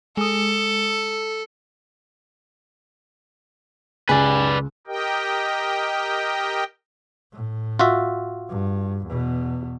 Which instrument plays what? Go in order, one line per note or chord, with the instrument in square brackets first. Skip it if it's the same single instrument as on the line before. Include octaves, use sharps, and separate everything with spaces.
[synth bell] G#3 D#6 [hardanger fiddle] A4
[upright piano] C#2 [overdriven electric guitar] B4 D5 [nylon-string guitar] G#5
[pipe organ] G4 A#4 D#5 G5
[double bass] A2
[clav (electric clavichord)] F4 F#4 E5
[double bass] G2
E2 B2